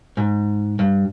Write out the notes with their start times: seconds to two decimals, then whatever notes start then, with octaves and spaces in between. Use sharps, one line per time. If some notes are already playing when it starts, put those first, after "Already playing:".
0.17 G#2
0.79 G2